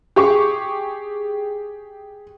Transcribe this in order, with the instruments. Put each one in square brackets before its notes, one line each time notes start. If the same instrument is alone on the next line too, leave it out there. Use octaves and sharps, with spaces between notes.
[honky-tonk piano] G4 G#4 C#6 D6